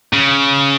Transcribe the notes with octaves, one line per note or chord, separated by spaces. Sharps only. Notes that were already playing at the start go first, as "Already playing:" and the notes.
C#3